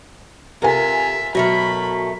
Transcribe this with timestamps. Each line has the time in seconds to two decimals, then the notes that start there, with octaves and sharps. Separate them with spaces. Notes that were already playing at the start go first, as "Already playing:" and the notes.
0.62 C3 F4 A4 A#4 E5 G#5
1.35 B2 F#3 A3 A#4 B5